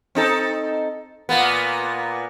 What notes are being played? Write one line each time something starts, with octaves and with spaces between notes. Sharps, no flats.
C4 D#4 A4
A#2 A#3 B3